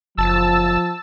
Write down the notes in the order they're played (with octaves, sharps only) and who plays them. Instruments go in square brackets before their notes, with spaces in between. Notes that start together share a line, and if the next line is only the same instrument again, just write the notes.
[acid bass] F#1 [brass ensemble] F3 [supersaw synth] A5 E6